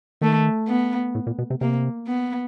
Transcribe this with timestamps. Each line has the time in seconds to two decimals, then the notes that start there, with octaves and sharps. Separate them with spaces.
0.21 D#3 A3
0.68 B3
1.15 A2
1.27 A#2
1.38 B2
1.50 C3
1.61 C3 A#3
2.08 B3